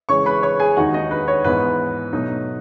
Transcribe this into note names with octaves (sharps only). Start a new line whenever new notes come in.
C#3 E3 G#3 C#5 C#6
B4 B5
C#5 C#6
G#4 G#5
D#2 D#3 G#3 D#4 F#4 F#5
D#4 D#5
B4
C#5
G#2 E3 B3 D#4 B4
B2 F#3 A3 D#4